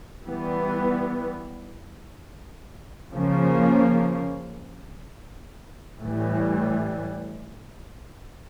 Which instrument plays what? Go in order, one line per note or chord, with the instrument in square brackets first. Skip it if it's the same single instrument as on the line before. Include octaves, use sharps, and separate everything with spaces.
[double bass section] E3 G3 B3
C#3 F3 A#3 C#4
A2 E3 G3